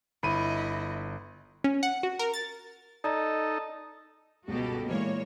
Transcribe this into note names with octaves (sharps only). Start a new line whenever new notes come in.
G1 E4 D#5 B5 D#7
C#4
F#5
F#4
A#4
A6
D#4 A4 D5 D#5 A#5
G1 C#2 B2 F#4 G4 A4 D#5
A#2 E3 G#3 A#3 C#5